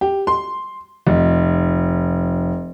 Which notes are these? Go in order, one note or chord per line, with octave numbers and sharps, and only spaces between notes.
G4
C6
F1